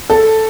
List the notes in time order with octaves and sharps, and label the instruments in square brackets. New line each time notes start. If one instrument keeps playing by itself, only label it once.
[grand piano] A4